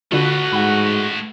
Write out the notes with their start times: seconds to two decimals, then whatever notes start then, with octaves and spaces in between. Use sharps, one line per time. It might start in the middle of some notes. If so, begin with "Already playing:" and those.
0.12 D3 A3 F4 F#4 B4
0.53 G#2 F#5 B5